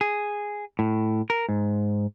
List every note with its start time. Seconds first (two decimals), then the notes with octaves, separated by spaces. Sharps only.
0.01 G#4
0.79 A2
1.30 A#4
1.49 G#2